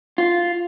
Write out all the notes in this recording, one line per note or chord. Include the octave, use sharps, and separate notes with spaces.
F4